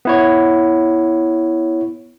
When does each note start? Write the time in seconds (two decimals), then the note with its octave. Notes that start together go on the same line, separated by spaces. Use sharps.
0.05 B3 E4 C#5